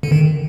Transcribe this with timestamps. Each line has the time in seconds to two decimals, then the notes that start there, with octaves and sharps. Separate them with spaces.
0.03 D3
0.12 D#3